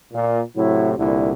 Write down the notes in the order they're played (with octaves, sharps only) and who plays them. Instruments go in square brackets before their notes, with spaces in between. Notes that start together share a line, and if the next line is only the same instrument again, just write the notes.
[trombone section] A#2
[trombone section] A2 C3 F#3 [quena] E4
[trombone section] C2 A#2 D3 [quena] E4